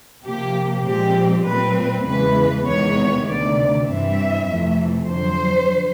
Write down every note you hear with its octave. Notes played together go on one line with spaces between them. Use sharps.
C3 F3 A#3 G4
A#2 F3 G#3 C4 G4
A#2 F#3 A3 C4 B4
E2 C#3 E3 G#3 B4
E2 C3 D#3 G#3 B3 C#5
D2 C3 D#3 D5
G2 E3 G3 C4 E5
F2 C3 E3 A3
F2 D3 F#3 C5